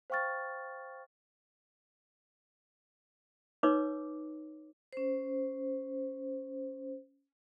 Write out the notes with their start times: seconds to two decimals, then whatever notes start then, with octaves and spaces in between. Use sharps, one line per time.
0.10 C5 F5 G5 C#6 F6 A6
3.63 D#4 B4 C#5 D6 E6
4.93 C#4 C5